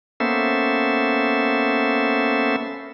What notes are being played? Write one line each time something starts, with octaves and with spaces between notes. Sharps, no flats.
A#3 B3 C#4 A4 C5 E5